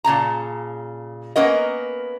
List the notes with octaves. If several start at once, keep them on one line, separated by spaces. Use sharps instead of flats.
A#2 C#3 A5 A#5
A#3 B3 C#4 A#4 D#5